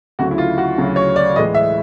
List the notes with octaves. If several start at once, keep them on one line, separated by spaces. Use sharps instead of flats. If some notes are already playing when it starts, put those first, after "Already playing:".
D2 C#3 F#3 F#4
E4
F4
F#4
D2 C#3 F#3
C#5
D5
A2 E3 G#3 D#5
E5